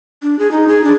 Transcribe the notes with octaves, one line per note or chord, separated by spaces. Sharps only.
D4
G#4
D#4
G#4
D4